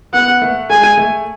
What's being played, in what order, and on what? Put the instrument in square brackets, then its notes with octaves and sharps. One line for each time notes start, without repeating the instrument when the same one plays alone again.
[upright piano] B3 [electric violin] F#5
[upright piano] A3
[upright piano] G#3 [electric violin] G#5
[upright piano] A3